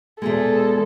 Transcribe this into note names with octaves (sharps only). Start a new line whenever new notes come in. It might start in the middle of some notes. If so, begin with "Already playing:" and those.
E2 B2 G#3 A4